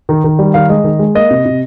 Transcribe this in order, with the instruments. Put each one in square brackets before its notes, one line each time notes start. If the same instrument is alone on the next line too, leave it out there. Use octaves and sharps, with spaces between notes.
[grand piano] D#3
D#3
G3
D#3 F5
G#3 D#5
D#3
G#3
A#3 D#5
C3
C3